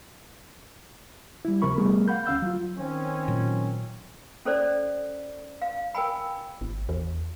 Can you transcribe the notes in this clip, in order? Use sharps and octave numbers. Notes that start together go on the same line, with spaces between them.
G3 E4
D2 C3 F3 A#4 B5 C#6
G3 A3 B3 G#4 A#4
F5 F#5 B5 G6
D2 C#4 F5 E6 G6
F#3 F4
D#3 C4 C#4
A#2 F#3
C#4 A4 C5 D5
F5
A#4 G5 G#5 B5
G#1
E2